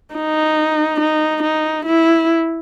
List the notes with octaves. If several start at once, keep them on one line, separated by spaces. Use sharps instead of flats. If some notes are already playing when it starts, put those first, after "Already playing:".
D#4
D#4
D#4
E4